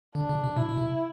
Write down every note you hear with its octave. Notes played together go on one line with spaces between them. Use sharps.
D3 D4
C#3
C3
B2 E4
B2
C3